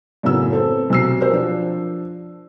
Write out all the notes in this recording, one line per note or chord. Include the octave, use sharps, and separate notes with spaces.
F#2 A2 C#3 B3 C#4 E6
C4 A4
B1 C3 E6 C7
G4 A#4 C5
F3 D4